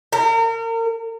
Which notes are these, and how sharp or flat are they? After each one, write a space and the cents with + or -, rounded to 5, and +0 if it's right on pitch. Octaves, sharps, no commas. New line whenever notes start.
A#4 -35